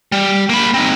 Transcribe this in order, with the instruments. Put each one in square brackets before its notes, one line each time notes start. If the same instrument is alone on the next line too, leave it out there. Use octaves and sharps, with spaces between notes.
[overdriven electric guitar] G3
A#3 B5
C4 D#4